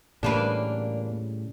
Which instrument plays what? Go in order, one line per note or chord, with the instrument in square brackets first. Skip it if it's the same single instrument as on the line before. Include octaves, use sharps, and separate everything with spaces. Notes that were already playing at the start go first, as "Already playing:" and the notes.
[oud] E2 A#3 B4 [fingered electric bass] A2 C#3 G3 [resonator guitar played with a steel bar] D4